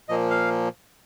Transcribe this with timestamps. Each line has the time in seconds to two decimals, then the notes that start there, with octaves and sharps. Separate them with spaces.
0.09 A#2 F3 A#3 D#5
0.30 F5